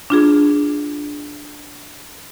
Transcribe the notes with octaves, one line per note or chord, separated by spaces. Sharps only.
D4 F4 G#4